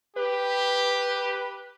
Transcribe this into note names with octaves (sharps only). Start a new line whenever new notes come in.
G4 B4